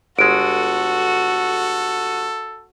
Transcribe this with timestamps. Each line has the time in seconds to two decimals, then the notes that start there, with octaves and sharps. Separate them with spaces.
0.19 G1 G#3 F#4 A4 D7